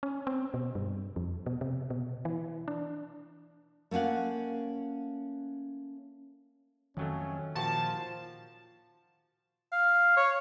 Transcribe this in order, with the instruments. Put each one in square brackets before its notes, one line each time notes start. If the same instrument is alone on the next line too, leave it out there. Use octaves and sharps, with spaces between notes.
[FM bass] C#4
C4
B2
G2
F2
B2
C3
B2
E3
D4
[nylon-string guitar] A3 A#3 C#4 F5 F#5
[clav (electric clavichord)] F2 F#3 A3 [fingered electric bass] D#3 [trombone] C#4
[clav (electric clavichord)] A#2 F#4 G4 [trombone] F3 [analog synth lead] A5
[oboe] F5
C#5